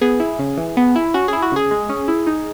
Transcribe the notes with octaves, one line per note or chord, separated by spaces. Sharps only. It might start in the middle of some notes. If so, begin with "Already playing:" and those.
B3 G#4
E4
C#3
E3
B3
E4
C#4 F#4
E4 G#4
F#4
C#3 G#4
G#3
C#4
E4
D#4